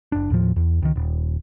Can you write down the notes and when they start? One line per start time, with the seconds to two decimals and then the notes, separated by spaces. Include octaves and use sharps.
0.12 F#1 D4
0.30 D#2 A2 F3
0.56 E2
0.82 C#2 D#3
0.96 D#1